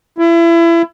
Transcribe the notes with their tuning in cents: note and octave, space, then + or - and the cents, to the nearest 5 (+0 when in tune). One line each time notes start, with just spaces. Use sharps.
E4 +30